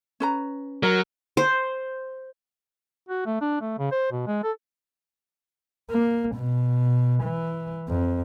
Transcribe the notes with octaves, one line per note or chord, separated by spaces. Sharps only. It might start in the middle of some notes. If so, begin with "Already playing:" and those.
C#4 B4 A#5
F#3 A#4
C5
F#4
A3
D4
A3
C#3
C5
B2
G#3
A4
A#3
B2
E3
F2